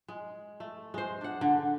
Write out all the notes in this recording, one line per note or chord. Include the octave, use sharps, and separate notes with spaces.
G#3
A3
G#3 C5
D4 F#5
D3